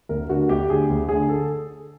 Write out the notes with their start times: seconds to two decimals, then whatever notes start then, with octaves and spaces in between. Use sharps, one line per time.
0.09 D2 A#4
0.29 D3 F#4
0.49 D2 G4
0.69 D3 G#4
0.90 D2
1.09 D3 G#4
1.29 A4